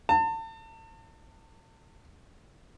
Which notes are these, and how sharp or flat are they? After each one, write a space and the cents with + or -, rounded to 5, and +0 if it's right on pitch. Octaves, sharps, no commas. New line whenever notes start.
A5 +35